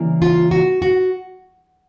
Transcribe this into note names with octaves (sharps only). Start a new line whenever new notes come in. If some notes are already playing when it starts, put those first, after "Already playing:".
Already playing: C#3 E3 G3 A#3
F4
F#4
F#4